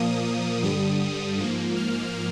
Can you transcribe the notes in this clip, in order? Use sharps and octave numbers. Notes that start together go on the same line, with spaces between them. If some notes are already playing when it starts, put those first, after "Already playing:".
Already playing: A#2 F3 A#3 D#6
G2 D3 G3 D#6
G#2 F3 A#3
F6